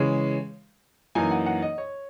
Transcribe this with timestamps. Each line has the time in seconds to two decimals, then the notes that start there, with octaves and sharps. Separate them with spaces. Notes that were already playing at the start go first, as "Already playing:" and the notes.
Already playing: C#3 E3 G#3 C#4
1.15 F#2 E3 A#3 D#4 G#5
1.31 F#5
1.46 F#5
1.62 D#5
1.78 C#5